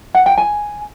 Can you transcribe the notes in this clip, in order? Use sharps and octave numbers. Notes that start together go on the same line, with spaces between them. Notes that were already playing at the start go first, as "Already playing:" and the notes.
F#5
G5
G#5